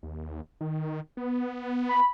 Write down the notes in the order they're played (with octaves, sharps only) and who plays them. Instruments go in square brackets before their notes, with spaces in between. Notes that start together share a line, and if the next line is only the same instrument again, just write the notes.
[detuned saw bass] D#2
D#3
B3
[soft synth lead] B5